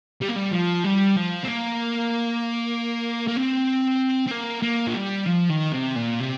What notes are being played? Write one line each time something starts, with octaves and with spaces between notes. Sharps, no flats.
G3
A#3
G3
F3
G3
F3
C4
A#3
A#3
C4
C4
A#3
A#3
F3
G3
F3
D#3
C3
A#2
C3